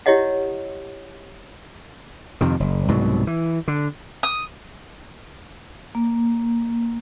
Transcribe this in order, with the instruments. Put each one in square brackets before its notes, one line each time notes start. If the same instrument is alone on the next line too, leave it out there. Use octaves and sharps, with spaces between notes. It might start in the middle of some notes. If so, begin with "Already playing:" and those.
[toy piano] E4 G4 C#5 D#5 F#5
[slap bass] F2 C3 D#3
F#1
C2 G#2 B2 F#3
E3
D3
[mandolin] D#6
[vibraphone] A#3